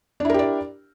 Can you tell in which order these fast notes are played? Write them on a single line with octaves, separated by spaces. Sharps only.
D4 E4 A#4 G4 D5